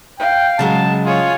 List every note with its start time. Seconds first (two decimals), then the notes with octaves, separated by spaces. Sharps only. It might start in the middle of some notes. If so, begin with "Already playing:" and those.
0.19 F5 G5
0.59 C#3 F#3 G#3 A5
1.05 F4 G#4 C#5